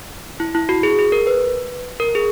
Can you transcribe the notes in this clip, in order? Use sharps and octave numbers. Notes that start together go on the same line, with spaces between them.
E4
E4
F#4
G#4
G#4
A#4
B4
A#4
G#4